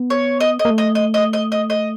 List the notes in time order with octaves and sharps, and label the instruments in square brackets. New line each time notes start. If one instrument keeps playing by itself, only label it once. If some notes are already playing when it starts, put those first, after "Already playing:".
Already playing: [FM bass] B3
[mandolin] C#5
D#5
D#5
[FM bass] A#3
A3
[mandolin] D#5
D#5
D#5
D#5
D#5
D#5